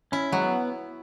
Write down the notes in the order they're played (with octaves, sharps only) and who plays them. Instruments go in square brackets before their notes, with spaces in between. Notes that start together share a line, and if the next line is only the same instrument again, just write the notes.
[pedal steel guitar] C#4 [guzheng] E4
[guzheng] F#3 [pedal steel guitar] G#3
[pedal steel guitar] B3